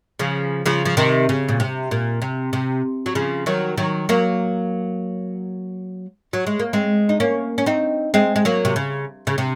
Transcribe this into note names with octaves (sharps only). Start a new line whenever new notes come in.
C#3 F3
C#3 F3
F3
C3 D#3
C#3
A#2
C3
A#2
C3
C3
F#3
C#3 F3
D#3 F#3
D#3 F#3
F#3 A#3
F#3
G#3
A#3
G#3 C4
D#4
A#3 C#4
C#4
C4 D#4
G#3 C4
G#3
F#3 A#3
C3
C#3
C#3
C3